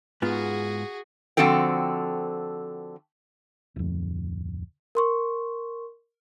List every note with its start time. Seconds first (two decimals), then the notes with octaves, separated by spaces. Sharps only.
0.22 G#2 B3 F4 F#4 G#4
1.37 D3 F3 C4 F#4 A4 G5
3.76 D1 F2
4.95 A#4 C6 C#6